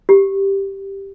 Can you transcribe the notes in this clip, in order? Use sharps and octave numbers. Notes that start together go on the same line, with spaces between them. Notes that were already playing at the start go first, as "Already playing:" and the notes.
G4